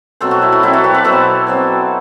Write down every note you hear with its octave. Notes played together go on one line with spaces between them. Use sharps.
B2 F#3 C4 A4 C5
F#4
E4
F#4
B2 F#3 C4 E4 G4
F#4 A4
G4 B4
B4 D5
B2 F#3 C4 A4 C5
B2 F#3 C4